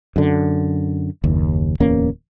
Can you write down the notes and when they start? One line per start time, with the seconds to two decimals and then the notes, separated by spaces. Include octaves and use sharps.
0.16 F#2 D3
1.24 F#1 D#2
1.80 D1 E2 A#3 C#4